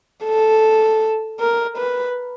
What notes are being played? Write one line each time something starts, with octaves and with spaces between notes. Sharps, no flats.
A4
A#4
B4